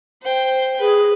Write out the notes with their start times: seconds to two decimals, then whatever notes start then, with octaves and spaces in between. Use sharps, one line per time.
0.22 C5 G5
0.80 G#4 B4